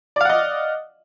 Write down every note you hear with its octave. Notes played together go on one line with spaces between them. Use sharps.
D5 D#5 F5 F#5